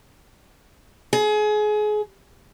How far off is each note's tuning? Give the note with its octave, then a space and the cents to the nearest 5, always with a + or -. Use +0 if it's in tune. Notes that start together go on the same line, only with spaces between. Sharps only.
G#4 +30